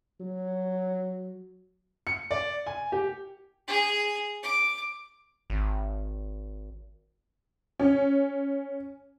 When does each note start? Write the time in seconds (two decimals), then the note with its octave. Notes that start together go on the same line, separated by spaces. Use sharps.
0.20 F#3
2.07 C#7
2.31 D5
2.66 G#5
2.92 G4
3.68 G#4
4.43 D6
5.50 G#1
7.80 C#4